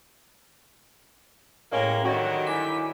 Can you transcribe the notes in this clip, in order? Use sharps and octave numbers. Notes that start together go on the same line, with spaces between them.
A2 G#3 A#3 C#4 E5 G5 A#5
G2 D3 D#3 F#3 F#4
E4 G#5 D6 B6